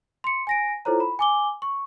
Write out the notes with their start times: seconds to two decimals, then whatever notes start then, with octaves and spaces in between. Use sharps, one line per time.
0.24 C6 C#7
0.47 G#5 A#6 D7
0.85 E4 F4 A4 C5 C#5 A#5
1.00 B5
1.19 G#5 D6 G7
1.62 C#6